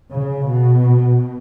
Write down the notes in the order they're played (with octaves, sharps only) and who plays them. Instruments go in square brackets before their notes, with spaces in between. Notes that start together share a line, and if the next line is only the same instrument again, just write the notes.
[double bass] C#3
B2